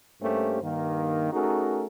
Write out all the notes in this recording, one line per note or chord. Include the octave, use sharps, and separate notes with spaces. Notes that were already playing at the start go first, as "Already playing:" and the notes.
G2 A3 A#3 C#4 G4 C5
G2 D#3 A#3
A3 C#4 D#4 F#4 G#4 A#4